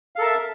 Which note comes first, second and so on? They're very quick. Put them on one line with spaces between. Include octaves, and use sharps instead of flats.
F5 A4 A#4 A5 E5